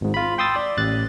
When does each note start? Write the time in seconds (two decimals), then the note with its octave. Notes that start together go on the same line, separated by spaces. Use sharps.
0.01 G#1 G#2
0.14 F4 B5
0.38 G5 C6 D#6 E6 A6
0.56 D5
0.77 A1 F#6 A6